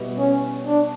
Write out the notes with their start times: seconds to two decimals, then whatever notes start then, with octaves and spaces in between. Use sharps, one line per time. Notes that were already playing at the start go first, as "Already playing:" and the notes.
Already playing: B2 G3 B3 E4 B4
0.18 C#4
0.66 D4